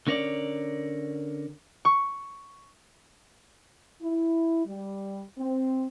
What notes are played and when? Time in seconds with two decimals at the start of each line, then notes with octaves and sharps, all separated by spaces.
0.07 D3 C#4 A#4 C#5 D5
1.85 C#6
4.02 E4
4.66 G3
5.39 C4